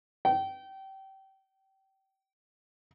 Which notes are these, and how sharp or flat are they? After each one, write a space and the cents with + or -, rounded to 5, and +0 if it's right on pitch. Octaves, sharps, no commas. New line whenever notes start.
G5 -25